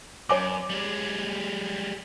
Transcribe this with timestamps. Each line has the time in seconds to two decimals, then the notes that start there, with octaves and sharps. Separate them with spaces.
0.29 F#2 C#5 G#5 D6
0.70 G3 G#3